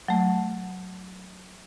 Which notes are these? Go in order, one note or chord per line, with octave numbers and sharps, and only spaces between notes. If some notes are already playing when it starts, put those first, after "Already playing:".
F#3 A3